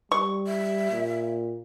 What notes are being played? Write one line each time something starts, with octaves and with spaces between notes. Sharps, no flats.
G3 C#6
E5
A#2